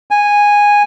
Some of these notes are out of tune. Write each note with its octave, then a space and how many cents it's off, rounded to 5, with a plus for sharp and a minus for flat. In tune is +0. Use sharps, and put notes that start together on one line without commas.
G#5 -10